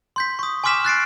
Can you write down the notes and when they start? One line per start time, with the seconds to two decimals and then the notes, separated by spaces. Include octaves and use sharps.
0.16 C6 G6 B6
0.39 C#6 D#6
0.64 G#5 C6 D6 F6 B6 E7
0.85 F#6 A6 C7 D7